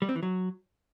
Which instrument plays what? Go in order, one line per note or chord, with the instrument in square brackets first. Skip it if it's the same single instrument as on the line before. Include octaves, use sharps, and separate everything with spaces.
[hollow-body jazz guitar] G3
C4
E3
F#3